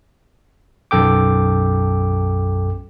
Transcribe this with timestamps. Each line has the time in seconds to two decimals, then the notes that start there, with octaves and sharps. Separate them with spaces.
0.91 B1 F#2 A4 G5 D6